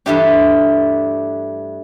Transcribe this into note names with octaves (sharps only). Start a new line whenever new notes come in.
G2 E3 A3 D4 G4